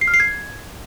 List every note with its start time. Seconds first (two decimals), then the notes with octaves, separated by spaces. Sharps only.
0.01 C7
0.08 F6
0.14 C7
0.20 G#6